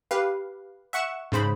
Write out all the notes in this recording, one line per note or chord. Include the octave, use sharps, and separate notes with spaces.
G4 B4 F5
E5 F#5 C#6 C#7 E7
G#2 C#3 C5 B5